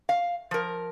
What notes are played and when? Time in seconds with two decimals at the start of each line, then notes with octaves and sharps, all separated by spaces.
0.09 F5
0.51 F3 A#4